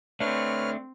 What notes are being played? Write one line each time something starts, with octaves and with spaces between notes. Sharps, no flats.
A3 C4 D4 B4 C#5 F6